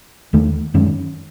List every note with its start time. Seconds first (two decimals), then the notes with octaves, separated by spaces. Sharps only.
0.33 D#2 D#3 A3
0.74 F#2 D#3 G#3 C#4